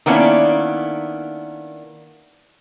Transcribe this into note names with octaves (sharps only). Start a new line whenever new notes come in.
D#3 A#3 B3 C#4 D4 E4